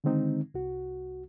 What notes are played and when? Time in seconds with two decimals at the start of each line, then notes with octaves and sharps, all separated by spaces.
0.04 D3 D#3 G#3 C4 D#4
0.54 C2 F#4